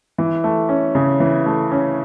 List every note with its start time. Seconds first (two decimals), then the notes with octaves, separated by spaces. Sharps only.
0.18 E3
0.44 A3
0.69 C#4
0.95 C#3
1.20 E3
1.46 A3
1.71 C#4